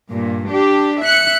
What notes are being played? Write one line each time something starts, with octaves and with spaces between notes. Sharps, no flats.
G2 A#2
D4 G4
E5 F#6 C#7